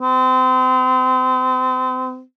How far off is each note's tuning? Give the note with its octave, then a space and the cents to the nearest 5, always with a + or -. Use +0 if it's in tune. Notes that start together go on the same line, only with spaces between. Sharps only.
C4 -35